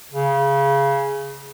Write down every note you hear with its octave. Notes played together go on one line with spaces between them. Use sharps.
C#3